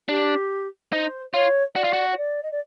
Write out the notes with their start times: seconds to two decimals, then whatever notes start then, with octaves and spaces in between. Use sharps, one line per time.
0.08 D4 G4
0.93 D#4 C5
1.33 F4 C#5
1.75 F#4 D5
1.84 F4
1.93 F#4
2.12 C#5
2.17 D5
2.42 D#5
2.51 D5